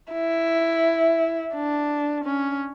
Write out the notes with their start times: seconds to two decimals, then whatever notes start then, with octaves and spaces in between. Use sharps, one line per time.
0.12 E4
1.54 D4
2.24 C#4